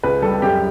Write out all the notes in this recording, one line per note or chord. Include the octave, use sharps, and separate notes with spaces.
C#2 B4
G3 A4
F#2 G4